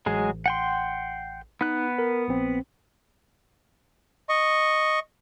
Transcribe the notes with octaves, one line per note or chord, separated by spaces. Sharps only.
A1 F#3 G#3 G#4
F#5 G5 C6
B3 D#4 F#6
A#4
A#1 C4
D#5 C#6